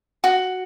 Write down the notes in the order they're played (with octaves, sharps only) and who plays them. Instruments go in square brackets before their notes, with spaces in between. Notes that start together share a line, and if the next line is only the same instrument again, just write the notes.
[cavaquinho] F#4